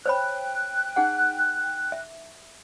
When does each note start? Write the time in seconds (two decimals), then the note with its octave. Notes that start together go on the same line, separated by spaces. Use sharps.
0.06 C5 C#5 G5 B5 F#6
0.96 D#4 G#4 F#5
1.92 E5